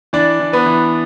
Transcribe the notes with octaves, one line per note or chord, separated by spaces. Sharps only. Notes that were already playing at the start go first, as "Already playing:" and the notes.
E3 D4 D5
E3
B3 B4
E3